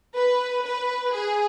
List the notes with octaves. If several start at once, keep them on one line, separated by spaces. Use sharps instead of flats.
B4
B4
G#4